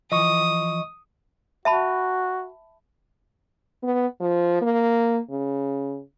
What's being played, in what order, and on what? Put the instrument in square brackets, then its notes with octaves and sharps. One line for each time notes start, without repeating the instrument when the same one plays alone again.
[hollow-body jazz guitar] E3 F3 [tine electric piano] D#5 C#6 [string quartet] D#6
[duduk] F#4 [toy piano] E5 A5 B5
[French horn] B3
F3
A#3
C#3